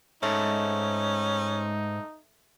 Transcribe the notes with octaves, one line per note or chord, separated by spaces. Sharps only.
G#2 A3 C#4 D#4